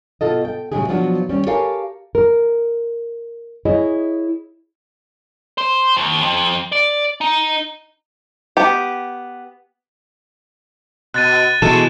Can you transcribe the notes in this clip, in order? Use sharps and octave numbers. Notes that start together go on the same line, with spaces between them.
B2 F4 A4 D#5
G5
A2 C#3 F#3 G#3 G4 G#4
B2 F3 F#3 B3 D4
D#2 G3 C#4
G4 A4 A#4 C#5 F5 G#5
A#4
E4 G#4 C#5 D#5
C5
D#2
F2
D5
D#4
B3 G4
B2 F#6 A6 D#7
B2 E3 G#3 A3 A4 E7